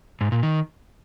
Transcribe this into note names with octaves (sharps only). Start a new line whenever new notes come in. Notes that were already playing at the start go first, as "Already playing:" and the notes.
G#2
A#2
D#3